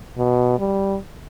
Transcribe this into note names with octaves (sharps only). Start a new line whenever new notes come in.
B2
G3